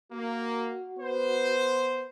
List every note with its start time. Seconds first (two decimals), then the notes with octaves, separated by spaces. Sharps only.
0.12 A#3 F#4
0.98 B3 B4 C5